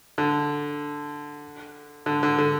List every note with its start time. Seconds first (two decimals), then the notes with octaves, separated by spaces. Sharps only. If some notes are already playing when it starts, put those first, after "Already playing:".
0.18 D3
2.06 D3
2.23 D3
2.38 D3